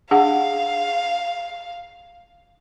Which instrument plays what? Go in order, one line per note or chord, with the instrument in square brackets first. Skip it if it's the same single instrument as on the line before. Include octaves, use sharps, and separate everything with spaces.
[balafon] D4 G#4 F#5 [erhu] F5